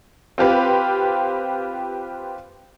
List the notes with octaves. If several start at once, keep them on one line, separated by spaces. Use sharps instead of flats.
C4 F4 G4 B4